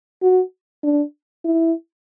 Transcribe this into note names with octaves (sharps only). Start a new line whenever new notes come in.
F#4
D4
E4